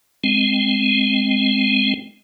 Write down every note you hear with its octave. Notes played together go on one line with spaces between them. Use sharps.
G#3 C4